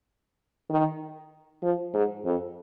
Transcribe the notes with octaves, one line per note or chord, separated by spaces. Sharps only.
D#3
F3
G#2
F2